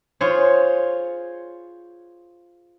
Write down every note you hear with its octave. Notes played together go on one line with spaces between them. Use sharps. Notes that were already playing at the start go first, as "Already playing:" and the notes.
F4 G#4 C5 C#5